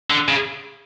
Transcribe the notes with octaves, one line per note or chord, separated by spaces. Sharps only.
D3
C#3